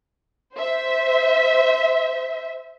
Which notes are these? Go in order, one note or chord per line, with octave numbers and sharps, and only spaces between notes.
C5 E5